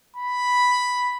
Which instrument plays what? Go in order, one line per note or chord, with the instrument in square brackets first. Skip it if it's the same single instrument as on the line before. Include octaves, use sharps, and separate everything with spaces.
[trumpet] B5